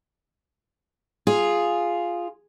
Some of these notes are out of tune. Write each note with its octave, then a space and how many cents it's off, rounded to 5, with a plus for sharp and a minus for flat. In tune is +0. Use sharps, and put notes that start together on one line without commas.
F4 +0 G#4 +0